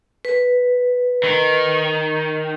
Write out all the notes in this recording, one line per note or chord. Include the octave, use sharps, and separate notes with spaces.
B4
D#3